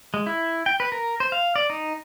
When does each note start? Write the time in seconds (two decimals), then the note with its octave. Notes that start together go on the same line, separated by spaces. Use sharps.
0.14 G#3
0.26 E4
0.66 G5
0.80 B4
0.92 A#4
1.20 C5
1.32 F5
1.56 D5
1.70 D#4